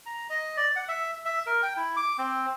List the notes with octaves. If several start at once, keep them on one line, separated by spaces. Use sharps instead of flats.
A#5
D#5
D5
F#5
E5
E5
A#4
G5
E4
D6
C4